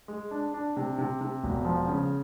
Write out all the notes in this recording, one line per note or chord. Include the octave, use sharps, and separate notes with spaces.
G#3
D4
D4
C3
C3
C3
E1
F3
C#3